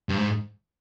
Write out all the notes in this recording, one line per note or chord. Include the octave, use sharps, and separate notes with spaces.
G2
G#2